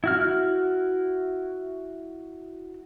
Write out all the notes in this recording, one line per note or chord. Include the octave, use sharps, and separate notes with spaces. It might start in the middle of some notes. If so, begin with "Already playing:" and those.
E4 F#4 F6